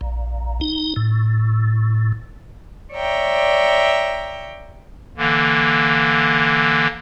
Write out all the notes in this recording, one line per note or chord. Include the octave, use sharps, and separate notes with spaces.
A#1
D#4
A2
C#5 D5 E5 G5 A#5
D3 E3 A#3